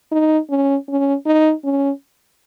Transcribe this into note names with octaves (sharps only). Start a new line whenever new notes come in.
D#4
C#4
C#4
D#4
C#4